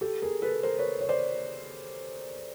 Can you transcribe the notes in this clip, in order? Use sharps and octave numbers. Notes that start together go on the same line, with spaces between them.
G4 A4
G#4 A#4
A4 B4
A#4 C5
B4 C#5
C#5
C5 D5